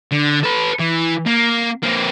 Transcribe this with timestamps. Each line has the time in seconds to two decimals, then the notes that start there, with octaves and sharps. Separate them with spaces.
0.12 D3
0.44 A4 B4
0.80 E3
1.26 A#3
1.83 A#3 C4